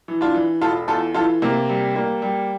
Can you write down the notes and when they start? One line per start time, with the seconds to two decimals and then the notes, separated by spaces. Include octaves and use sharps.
0.08 E3
0.21 D4 F4
0.34 E3
0.61 E1 F4 A4
0.88 E2 F4 A4
1.14 E3 F4 A4
1.42 C3 A#3
1.69 G3
1.96 A#3
2.22 G3